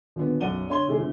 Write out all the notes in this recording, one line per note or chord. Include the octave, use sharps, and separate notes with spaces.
D#1 D3 B3
B1 F#2 D5 F#5 D#7 G7
D3 C#5 C6 G7
C3 D#3 G#3 G#4
G1 D3